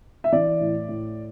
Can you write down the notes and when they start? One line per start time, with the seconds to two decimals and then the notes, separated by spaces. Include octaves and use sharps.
0.24 E5
0.32 E3 D5
0.60 A2
0.88 A2